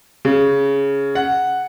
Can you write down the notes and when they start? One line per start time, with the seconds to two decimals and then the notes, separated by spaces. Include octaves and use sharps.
0.25 C#3
1.15 F#5